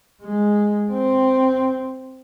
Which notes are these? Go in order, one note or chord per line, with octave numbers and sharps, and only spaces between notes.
G#3
C4